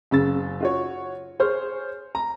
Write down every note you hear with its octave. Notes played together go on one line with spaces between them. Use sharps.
F#1 C#3 E6 A6
F4 F#4 C#5
G#4 C5 C#5 F6
A#5